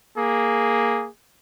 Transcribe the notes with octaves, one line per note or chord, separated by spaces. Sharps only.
A#3 G#4